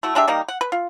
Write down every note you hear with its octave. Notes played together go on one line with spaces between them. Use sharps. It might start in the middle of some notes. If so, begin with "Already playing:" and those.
A3 E4 F#4
G#3 D4 G4 E5
D#3 G3 A#3 D#4
F#5
B4
F4